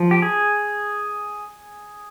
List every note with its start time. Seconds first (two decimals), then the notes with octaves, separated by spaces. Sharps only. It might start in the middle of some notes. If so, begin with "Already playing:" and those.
Already playing: F3
0.11 G4
0.22 G#4